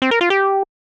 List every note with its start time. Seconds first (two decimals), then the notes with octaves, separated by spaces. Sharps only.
0.02 C4
0.11 A#4
0.21 F4
0.30 G4